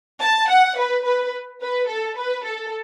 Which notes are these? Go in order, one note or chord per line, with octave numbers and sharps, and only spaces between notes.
A5
F#5
B4
B4
B4
A4
B4
A4